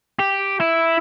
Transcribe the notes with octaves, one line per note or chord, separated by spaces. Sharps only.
G4
E4